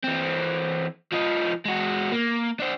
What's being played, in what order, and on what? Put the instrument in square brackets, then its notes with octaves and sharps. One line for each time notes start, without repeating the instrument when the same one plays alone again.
[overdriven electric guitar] E3 C4
F3 D#4
G#3 F#4
A#3
D4 C5